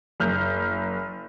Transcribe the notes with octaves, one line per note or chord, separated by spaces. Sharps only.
F#1 F6 G6